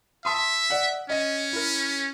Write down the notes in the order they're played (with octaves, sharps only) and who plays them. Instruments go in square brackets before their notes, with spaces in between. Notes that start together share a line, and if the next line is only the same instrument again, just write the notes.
[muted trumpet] E5 [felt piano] A5 C6 D#6
[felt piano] D5 F#5
[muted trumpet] C#4 [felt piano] D#5
[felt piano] E4 A#4